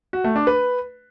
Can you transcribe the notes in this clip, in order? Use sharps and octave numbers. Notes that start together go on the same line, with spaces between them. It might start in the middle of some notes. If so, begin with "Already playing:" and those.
F#4
A3
D4
B4